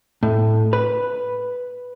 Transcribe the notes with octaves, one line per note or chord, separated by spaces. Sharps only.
A2
B4